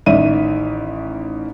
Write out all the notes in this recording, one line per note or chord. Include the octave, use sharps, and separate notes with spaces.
A1 D#3 D5 E5 D#7